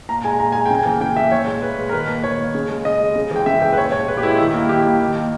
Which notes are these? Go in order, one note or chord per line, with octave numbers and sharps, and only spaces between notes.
A#2 A#5
G#3 G#5
A#2 A#5
G#3 G#5
C#3 G5
G#5
E3 A#3
C#3 G5
E3 A#3 E5
A#2 C#5
G#3
A#2 B4
G#3
A#4
D#3 B4
A#3
D#3 C#5
A#3
C#3
G#3
C#3 D#5
G#3
C#3
E3 G#3 G5
C#3 E5
E3 G#3 G5
B4
A#2 C#5
G#3 C#5
A#2 B4
G4
G#3 E4
D#3 E4
G3 A#3 E4
D#3 G4
G3 A#3
D#3
A#3